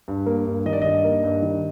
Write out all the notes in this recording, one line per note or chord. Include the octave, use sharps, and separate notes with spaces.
G2
A#3
G2
D#3 D#5
D5
G2 D#5
A#3
G2
D#3